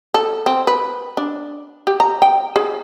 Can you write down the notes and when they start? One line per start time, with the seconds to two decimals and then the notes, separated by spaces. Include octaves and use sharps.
0.14 A4
0.46 C4
0.67 B4
1.17 D4
1.87 G4
2.00 A#5
2.22 G5
2.56 G#4